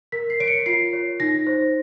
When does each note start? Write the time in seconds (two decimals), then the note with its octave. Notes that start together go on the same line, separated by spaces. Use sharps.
0.12 A#4 B6
0.30 C7
0.40 C#5 D7
0.48 C#7
0.66 F4 C7
0.93 C#5
1.20 D#4 A#6
1.47 C5